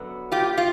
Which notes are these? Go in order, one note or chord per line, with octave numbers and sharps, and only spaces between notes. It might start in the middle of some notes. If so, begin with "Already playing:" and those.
Already playing: F#2 D3 F#3 B3
F4 G4
F4